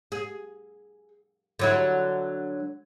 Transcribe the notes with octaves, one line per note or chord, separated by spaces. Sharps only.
G#4
D3 F#3 E4